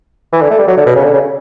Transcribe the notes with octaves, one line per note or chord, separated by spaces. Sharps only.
E3
D3
A3
G3
F#3
D3
B2
C#3
D3
C#3